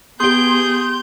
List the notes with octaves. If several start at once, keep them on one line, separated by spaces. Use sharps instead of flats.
B3 G4 G#4 C6 G6